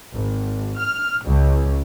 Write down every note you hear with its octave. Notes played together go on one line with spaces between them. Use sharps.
G#1
F6
C#2